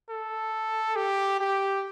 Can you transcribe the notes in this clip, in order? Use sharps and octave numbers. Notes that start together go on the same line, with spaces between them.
A4
G4
G4